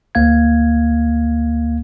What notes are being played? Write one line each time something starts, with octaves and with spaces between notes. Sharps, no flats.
D2 A#3 F5 G#6